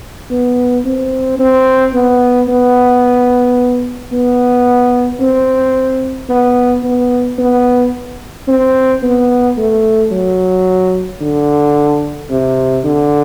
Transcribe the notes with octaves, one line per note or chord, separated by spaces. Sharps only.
B3
C4
C4
B3
B3
B3
C4
B3
B3
B3
C4
B3
A3
F#3
D3
C3
D3